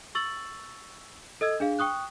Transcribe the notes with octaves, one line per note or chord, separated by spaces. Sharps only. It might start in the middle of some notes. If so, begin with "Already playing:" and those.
C#6 E6 A6 F#7
A4 D#5 E6 G#6
D4 G#4 F5
G5 C#6 D#6 F#6